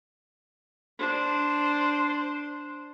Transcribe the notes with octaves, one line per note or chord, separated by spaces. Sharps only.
D4 C5